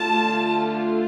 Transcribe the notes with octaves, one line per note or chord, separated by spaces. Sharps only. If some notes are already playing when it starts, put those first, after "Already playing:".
Already playing: D3 A3 F4 A5